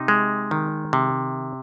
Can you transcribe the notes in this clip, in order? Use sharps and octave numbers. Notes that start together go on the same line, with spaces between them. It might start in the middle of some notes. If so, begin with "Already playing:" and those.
Already playing: C3 D#4
G#3
D#3
C3